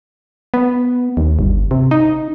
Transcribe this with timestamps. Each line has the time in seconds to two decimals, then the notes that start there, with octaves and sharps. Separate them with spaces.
0.54 B3
1.17 D#2
1.39 G1
1.71 C3
1.91 D#4